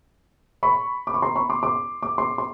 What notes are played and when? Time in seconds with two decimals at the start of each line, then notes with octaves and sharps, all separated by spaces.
0.63 B5 C#6
1.07 D6
1.14 C#6
1.22 A#5 C6
1.36 B5 C#6
1.50 C6 D6
1.63 C6 D6
2.03 D6
2.18 C6 D6
2.38 C6